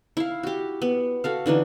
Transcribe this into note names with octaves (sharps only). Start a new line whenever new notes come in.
E4 F5
F#4 G4
B3
F#4 A4 F5
D3 E3 D4 D#4